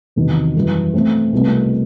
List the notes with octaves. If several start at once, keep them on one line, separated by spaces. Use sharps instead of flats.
E2 C3 D#3 F#3 B3
F#2 E3 G3
B2 A3 C4
C2 B2 A3